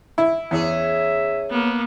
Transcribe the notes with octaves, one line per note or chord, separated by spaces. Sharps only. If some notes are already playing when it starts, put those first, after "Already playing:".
E4
E2 C#4 G#4 E5
A#3 B3